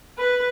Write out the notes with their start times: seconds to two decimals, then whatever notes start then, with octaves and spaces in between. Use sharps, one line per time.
0.18 B4